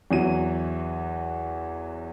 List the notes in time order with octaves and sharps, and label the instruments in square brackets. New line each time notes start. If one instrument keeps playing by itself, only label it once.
[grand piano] E2 E3 F#3 D#7